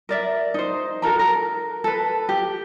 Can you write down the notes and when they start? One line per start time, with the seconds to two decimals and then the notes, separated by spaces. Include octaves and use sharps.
0.09 A#4 D5 E5
0.54 D#4 C5
1.02 F#4 A4 A#4 A#5
1.19 A#4
1.84 A4 B4
2.29 G4